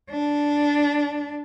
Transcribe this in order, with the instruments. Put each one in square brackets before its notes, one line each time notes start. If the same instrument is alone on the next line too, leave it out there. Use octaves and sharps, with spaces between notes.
[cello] D4